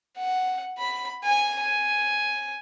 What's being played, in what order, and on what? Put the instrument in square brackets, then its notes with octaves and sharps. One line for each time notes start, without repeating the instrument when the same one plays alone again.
[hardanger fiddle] F#5
B5
G#5
G#5